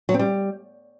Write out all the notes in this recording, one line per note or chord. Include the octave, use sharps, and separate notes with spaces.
F#3
C4
G3